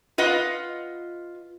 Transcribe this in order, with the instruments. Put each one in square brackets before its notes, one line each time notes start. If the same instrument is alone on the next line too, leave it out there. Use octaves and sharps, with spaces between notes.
[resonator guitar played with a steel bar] F4 B4 D#5 F#5